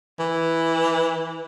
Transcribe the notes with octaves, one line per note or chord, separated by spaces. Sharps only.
E3